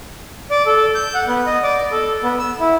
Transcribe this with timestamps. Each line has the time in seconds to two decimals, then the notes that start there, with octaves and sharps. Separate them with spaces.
0.51 D5
0.66 A4
0.95 G6
1.14 F#5
1.28 B3
1.47 D#5
1.63 D5
1.92 A4
2.23 B3
2.39 E6
2.60 E4